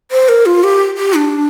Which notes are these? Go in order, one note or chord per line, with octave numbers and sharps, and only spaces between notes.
C5
A#4
F4
G4
G4
D4